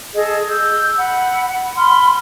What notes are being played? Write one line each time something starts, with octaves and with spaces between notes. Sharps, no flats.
G#4 A4 D#5
E6 G6
F#5 B5
B5 C6 F6